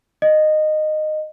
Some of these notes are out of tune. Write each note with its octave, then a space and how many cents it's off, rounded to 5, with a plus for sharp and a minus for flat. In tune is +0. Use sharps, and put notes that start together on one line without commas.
D#5 -15